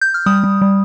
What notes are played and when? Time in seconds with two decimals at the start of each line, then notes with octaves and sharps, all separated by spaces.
0.01 G6
0.14 F6
0.26 G3 D#6
0.44 G3
0.62 G3